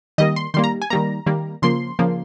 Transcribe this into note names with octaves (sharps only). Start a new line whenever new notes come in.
D#3 G3 A#3 D#5
C6
D#3 G3 A#3 C6
A#5
G#5
D#3 G3 A#3 A#5
D#3 G3 A#3
C#3 F3 A#3 C6
C#3 F3 A#3